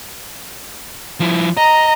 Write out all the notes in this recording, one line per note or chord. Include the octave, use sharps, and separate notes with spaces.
F3 E4
D#5 A#5